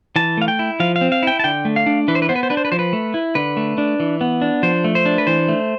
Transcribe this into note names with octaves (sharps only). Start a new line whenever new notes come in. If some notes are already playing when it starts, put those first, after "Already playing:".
E3 A5
A3 F5
G5
E4
F3 F5
F5
C4
F5
E4 G5
A5
D3 G5
A3
F5
D4
E3 B4
C5
B4
B3 C5
B4
C5
D4 B4
C5
B4
F3 C5
B4
A3
E4
D3 B4
A3
D4
E3
B3
D4
F3 C5
A3
C5
D4
B4
E3 C5
A3